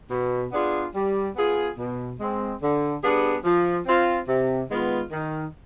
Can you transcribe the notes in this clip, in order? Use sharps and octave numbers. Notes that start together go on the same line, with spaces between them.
B2
B3 D4 F4 G#4
G3
B3 F4 G#4
B2
G#3 C4
D3
G3 B3 D4 G#4
F3
C4 F4
C3
D#3 G#3 B3 F4
D#3